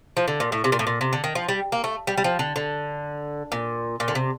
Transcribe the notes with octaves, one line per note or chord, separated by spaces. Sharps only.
F3
D3
A#2
A2
C3
A#2
A2
A#2
C3
D3
D#3
F3
G3
A#3
A3
G3
G3
F3
D3
D3
A#2
A#2
D3
C3